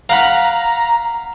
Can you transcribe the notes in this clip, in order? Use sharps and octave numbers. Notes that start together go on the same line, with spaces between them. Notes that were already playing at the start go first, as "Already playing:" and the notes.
F5 F#5 A#5 B5